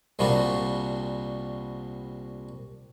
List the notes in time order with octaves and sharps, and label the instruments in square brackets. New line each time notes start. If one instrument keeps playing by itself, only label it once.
[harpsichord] C2 A#2 G3 D4 F#4